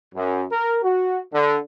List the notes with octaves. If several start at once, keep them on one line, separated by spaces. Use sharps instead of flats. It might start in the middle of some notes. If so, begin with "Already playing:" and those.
F#2
A#4
F#4
D3